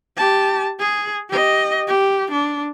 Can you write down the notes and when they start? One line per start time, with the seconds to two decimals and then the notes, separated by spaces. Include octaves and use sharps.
0.17 G4 A5
0.79 G#4
1.29 G4 D#5
1.87 G4
2.31 D4